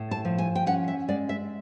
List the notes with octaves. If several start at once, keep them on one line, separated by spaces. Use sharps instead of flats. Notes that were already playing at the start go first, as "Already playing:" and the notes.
Already playing: A2
A5
F3
G#5
G5
C#4 F#5
E5
G#3 D5
E5